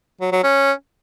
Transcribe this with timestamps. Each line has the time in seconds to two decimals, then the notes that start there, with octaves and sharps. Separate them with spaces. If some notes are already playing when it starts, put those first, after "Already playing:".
0.21 F#3
0.32 F#3
0.43 C#4